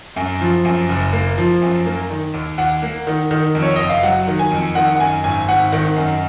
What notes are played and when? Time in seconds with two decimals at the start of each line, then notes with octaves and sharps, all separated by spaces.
0.16 F#2
0.41 F3
0.65 F#2
0.89 F#1
1.13 A#3
1.38 F3
1.62 F#2
1.86 A#3
2.10 D#3
2.34 D#2
2.58 D#2 F#5
2.82 A#3
3.07 D#3
3.31 D#3
3.55 F2
3.62 C#5
3.76 F#1 D#5
3.89 F5
4.03 F#3 F#5
4.27 D#3
4.39 G#5
4.51 F2
4.75 D#3 F#5
4.96 F#5
4.99 F#2 G#5
5.24 G#1 G#5
5.49 G#1 F#5
5.72 D#3
5.96 F#2